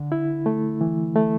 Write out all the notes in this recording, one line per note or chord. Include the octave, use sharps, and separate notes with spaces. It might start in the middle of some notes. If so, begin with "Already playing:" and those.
Already playing: D3
E4
A3
E3
A3